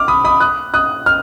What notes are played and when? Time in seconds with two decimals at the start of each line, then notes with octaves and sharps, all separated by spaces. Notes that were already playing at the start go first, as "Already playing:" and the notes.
Already playing: D6 F6
0.08 B5 D#6
0.25 B5 D#6
0.40 D#6 F#6
0.74 D#6 F#6
1.06 F6